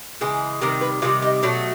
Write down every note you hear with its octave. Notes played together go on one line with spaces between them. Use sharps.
C#3 E3 G#3
C3 D#3 G3 A#4
B4
C3 D#3 G3 F4
D#4
B2 F#3 A3 D4